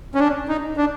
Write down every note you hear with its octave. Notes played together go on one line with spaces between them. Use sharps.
C#4
D4
D#4
D4